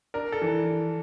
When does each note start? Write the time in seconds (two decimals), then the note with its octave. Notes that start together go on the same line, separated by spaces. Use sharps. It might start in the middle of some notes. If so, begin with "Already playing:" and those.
0.14 D4 A#4
0.32 A4
0.42 E3